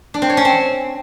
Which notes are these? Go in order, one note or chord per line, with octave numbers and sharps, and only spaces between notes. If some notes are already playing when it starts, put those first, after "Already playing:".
D4
C4
C#5
C#4
C4